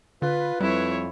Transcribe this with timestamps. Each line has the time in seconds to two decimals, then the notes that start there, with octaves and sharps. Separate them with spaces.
0.22 D3 F4 B4
0.60 F2 G3 E4 C#5